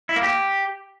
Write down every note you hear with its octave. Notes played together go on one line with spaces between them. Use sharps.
E4
A#3
G4